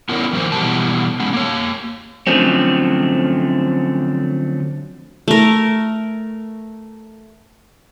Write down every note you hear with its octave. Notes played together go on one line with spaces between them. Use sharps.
B3 C#4 E4 A#4 C#5 D5
D#3 F3 A#4 C5
B2 E3 G3 A5
G#3 B3 C#4
A#3 C#5
D3 F3 F#3 A3 C4 C#4
A3 A#4